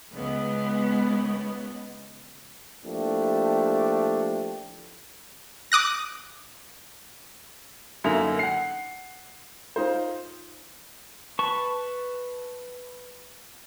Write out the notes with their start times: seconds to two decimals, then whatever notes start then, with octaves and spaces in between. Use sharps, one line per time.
0.12 C#2 B3
2.85 F3 A3 A#3 D4 E4 G4
5.72 D6 D#6 F#6 A#6
8.04 F#2 D3 A#3 D#4 E5 F7
8.39 F#5 C7
9.76 D#4 F4 C5
11.39 B4 A5 C#6